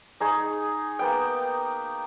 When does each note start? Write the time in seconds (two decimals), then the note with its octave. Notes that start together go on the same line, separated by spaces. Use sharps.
0.20 D#4 G#4 C#6
0.99 A#3 B3 G5